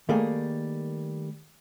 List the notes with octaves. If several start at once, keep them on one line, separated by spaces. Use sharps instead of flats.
D#3 G3 A3 A#3 G#4